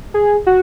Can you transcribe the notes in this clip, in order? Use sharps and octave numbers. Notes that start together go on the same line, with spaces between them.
G#4
F#4